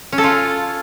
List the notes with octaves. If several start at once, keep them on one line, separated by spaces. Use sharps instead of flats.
C#4
A4
F4